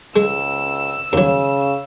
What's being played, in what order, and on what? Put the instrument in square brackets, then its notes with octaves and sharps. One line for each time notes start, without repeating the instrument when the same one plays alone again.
[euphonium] C#2 [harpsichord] G#3 [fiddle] E6
[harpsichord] D#2 F#3 [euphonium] C#3